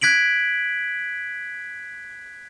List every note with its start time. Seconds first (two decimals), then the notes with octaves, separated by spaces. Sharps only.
0.01 F#6 G#6 B6 D7 F#7